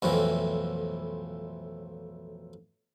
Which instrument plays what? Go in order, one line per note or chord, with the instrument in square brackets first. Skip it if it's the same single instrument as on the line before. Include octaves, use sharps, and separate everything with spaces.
[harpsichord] B1 F2 A2 E3